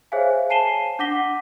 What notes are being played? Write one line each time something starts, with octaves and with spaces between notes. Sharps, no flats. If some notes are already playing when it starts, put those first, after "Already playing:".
G#4 C5 C#5 E5 F5 G#5
G#5 A5 C7 D#7 E7 G7
D4 F#5 D6 A#6 B6 G7